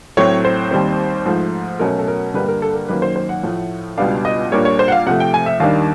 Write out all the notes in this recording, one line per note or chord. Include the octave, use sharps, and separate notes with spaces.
A2 F#3 A3 C4 C#5
C5
D#2 D#3 G3 C4
G#2 F3 A3
B2 F#3 A3 C#4 A#4
A4
A#4
G2 D3 G3 A#3 D4 B4
A#4
A4
A#4
F#2 D#3 F#3 A#3 B4
C5
C5
F#5
A2 F3 A3
C#2 B2 G3 B3 D4 F5
D#5
A#2 G3 A#3 D4 C#5
C#5
C5
F#5
F5
C3 F3 A3 F#5
G5
G#5
E5
D#2 D#3 G3 A#3 D4 F5